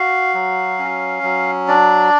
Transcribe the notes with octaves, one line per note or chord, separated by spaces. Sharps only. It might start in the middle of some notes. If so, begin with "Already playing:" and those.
Already playing: F#4 F5
F#3
C#4
F#3
D4 D5